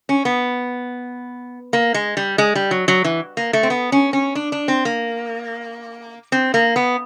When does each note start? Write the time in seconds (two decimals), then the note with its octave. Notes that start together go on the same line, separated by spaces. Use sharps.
0.09 C#4
0.25 B3
1.73 A#3
1.94 G#3
2.17 G3
2.38 G#3
2.55 G3
2.71 F#3
2.88 F#3
3.04 E3
3.37 A#3
3.53 A3
3.63 C4
3.70 B3
3.92 C#4
4.13 C#4
4.35 D4
4.52 D4
4.68 C4
4.85 A#3
6.32 C4
6.54 A#3
6.76 B3